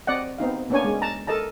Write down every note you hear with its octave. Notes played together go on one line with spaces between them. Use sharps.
C4 D5 D#5 F#5
B3 C4 D#4 F5
A#3 B3 C#4 D4 C#5 G#5
G#3
A5 A#5
A4 A#4 D#5 A5 A#5